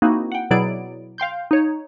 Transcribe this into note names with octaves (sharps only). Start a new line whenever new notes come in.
A#3 C4 D#4 E4 F#4
F#5 G5
B2 F#3 E4 G#4 D5 D7
F5 G5 C6 G6
D#4 C#5